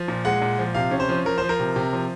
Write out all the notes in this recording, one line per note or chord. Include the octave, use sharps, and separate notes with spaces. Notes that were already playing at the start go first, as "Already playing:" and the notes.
Already playing: F3
A#2
G#3 F#5
A#2
F3
C3 F5
C#4
C5
F3
F3 A#4
F3 C5
A#4
C3
C3
F3